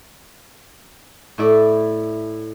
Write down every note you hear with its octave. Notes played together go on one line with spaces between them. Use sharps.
A2 E4 D5